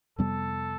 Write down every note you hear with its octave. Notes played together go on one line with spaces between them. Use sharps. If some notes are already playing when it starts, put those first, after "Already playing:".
F2 C3 G3 B3 A4